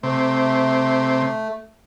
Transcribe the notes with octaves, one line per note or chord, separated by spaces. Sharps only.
C3 A3